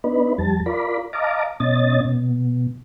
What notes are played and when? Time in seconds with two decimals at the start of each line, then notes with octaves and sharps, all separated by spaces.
0.04 B3 D4 D#4 B4
0.38 F2 G3 A5
0.66 F4 A#4 D5 B5
1.13 D#5 F5 A5 A#5 D6
1.60 B2 C#4 D#5 A6
2.05 B2